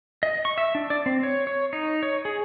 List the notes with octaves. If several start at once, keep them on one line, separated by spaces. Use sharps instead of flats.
D#5
C#6
E5
D4
D5
C4
C#5
C#5
D#4
C#5
G#4